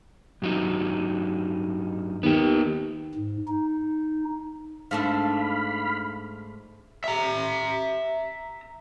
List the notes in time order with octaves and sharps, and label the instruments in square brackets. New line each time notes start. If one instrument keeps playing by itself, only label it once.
[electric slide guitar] G2 F#3 D#4
[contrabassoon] D#2 [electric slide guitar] B3 G4
[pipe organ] G#2
D#4
[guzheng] G#2 A3 D4 [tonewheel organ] F5 B5
[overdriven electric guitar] E5 A#5